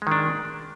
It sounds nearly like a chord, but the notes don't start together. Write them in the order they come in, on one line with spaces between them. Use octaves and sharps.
G#3 D#3 D4